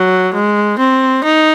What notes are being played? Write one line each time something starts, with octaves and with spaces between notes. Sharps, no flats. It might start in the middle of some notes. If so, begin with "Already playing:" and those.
Already playing: F#3
G#3
C4
D#4